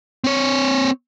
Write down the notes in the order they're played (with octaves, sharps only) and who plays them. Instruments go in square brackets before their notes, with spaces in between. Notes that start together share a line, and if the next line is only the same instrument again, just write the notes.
[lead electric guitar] C4 C#5